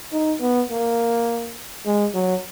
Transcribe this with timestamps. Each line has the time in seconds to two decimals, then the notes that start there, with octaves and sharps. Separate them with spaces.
0.13 D#4
0.41 B3
0.71 A#3
1.86 G#3
2.15 F#3